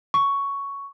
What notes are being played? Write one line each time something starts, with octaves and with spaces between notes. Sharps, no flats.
C#6